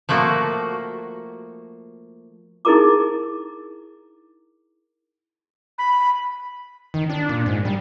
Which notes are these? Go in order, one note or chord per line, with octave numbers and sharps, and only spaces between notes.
F3 A3 A#3 F#4
D#4 E4 G#4 A#4 A#5 D6
B5
D#3
D4
A#2
G#2
G3